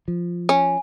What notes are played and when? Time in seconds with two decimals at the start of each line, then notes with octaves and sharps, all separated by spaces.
0.08 F3
0.49 C#4 G#5